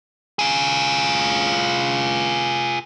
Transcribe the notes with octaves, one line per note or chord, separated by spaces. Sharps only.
F4 G#4